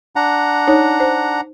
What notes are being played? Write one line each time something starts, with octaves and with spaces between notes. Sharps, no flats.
D4 F#5 A#5
D#4 C#5
C5